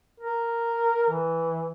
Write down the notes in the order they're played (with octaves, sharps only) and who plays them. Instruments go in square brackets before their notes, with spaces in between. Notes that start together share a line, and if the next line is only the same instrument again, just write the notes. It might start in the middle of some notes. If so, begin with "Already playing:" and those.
[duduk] A#4
E3